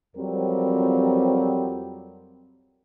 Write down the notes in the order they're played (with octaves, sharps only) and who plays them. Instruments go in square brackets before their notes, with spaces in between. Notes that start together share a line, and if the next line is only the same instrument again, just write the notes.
[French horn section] F2 F#3 G3 C4 A#4